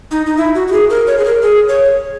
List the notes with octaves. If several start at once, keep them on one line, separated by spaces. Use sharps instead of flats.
D#4
D#4
E4
F#4
F#4
G#4
A#4
C#5
G#4
A#4
G#4
C#5